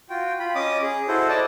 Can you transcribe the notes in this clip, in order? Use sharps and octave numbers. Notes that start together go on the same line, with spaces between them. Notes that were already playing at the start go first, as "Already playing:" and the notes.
F4 F#4 G5
F4 B5
C#4 D#5 D6 D#6
G#4
E4 F#4 A4 C5
D5 D#5 A5